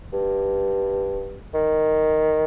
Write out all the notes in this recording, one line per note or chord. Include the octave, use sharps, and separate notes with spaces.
G2
D#3